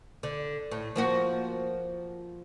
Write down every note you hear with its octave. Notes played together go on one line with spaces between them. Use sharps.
D3
A2
F3 A#3 F#4